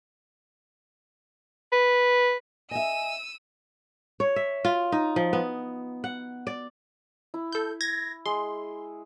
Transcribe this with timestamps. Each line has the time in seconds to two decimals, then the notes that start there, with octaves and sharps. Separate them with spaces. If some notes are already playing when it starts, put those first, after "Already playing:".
1.72 B4
2.71 D#5 E5 G#5 E6 D#7
4.20 C#5
4.36 E5
4.65 F4
4.92 D#4
5.16 F3
5.33 B3
6.04 F#5
6.47 D5
7.34 E4
7.52 A4 G6
7.81 G#6 A#6
8.26 G#3 C6